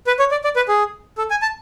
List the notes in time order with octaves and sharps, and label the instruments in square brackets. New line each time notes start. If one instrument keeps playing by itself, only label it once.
[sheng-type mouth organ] B4
C#5
D5
D5
B4
G#4
A4
G#5
A5